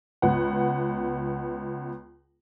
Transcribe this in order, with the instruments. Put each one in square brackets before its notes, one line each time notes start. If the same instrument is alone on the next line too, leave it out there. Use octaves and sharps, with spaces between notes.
[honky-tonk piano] C#2 B3 F#5